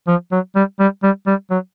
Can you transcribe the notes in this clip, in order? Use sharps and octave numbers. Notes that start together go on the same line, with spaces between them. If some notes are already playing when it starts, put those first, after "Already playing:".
F3
F#3
G3
G3
G3
G3
F#3